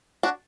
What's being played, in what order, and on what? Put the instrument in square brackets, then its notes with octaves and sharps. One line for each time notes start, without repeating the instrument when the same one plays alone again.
[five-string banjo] D4 F#4